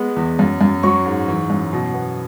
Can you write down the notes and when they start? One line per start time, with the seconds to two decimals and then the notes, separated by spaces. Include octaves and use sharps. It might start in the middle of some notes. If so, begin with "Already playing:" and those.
Already playing: G#3 B3
0.16 E2
0.39 F#2
0.61 F#2
0.83 F#3 C#6
1.06 G#2
1.28 E3
1.50 F#2
1.73 B2
1.94 B3